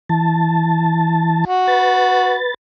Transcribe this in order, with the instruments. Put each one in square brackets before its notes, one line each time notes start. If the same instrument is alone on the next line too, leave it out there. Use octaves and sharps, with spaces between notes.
[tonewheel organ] E3 A5
[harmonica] F#4
[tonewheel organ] B4 A6